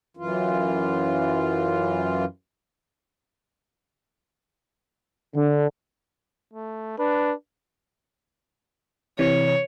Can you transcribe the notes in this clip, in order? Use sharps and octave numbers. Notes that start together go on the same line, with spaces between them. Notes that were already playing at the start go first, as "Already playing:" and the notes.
F#2 E3 F4
D3
A3
D4 B4
C3 E3 C#5